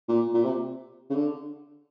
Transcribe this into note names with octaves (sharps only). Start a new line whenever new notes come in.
A#2
A#2
C3
C#3
D3